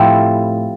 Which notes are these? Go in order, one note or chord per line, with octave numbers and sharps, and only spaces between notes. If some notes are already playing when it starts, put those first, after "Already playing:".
Already playing: A2 F3 A3 C4 E4 G4 A4